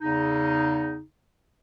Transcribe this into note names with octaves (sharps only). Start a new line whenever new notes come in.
E2 C#3 D#4